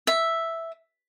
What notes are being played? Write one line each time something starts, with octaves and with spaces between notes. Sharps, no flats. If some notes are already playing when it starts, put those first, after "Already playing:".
E5